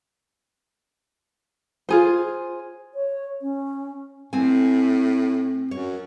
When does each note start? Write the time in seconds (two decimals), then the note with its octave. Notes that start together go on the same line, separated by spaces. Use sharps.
1.89 F4 G#4 C5
2.95 C#5
3.41 C#4
4.33 A2 C4 G#5
5.71 F#2 C#5